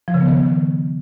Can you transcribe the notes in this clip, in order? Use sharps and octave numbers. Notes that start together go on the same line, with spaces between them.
F3
C#3
B3
D#3